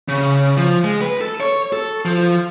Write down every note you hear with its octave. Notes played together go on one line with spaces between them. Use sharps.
C#3
F3
G#3
B4
A4
C#5
A4
F3